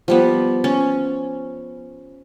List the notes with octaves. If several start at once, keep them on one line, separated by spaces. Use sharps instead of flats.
F3 G3 B3
C#4